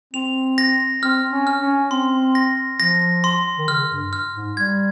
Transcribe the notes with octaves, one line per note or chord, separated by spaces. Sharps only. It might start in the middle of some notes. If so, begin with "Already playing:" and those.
C4 F7
A#6
C4 F6
C#4
F6
C#4
C4 C6
A#6
F3 A#6
C6
D#3
C#3 F6
G2
F6
G#2
G3 G#6